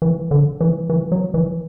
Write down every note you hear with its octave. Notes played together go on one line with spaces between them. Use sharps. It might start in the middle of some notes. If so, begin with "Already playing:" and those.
E3
D3
E3
E3
F#3
E3